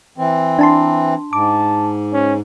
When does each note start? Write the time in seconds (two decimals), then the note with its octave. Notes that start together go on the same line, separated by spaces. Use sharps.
0.18 E3 C4
0.59 D4 A5 C6
1.33 G#2 A5 D6
2.13 C#4